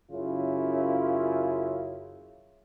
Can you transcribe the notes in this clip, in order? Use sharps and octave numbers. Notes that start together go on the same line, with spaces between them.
F#2 C#3 E4 F4